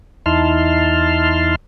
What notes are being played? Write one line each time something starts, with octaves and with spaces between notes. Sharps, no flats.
E2 D#4 E4 A5 C6 F6